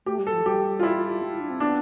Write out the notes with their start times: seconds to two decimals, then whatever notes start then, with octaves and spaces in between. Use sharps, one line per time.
0.06 A3 G4
0.19 G3
0.27 A4
0.33 F3
0.45 G3 G4
0.79 F4
0.83 E4
1.22 F4
1.31 E4
1.40 D4
1.50 C4
1.60 B3 D4